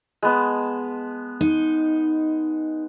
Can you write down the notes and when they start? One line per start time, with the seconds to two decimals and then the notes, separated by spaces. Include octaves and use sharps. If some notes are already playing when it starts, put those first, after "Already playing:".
0.23 G#3 B3 A5
1.41 D#4